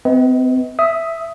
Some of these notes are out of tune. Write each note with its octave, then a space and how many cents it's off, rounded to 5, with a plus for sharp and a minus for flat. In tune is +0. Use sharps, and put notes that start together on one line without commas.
C4 -40 B4 +0 D#5 +35
E5 +0 D#6 +15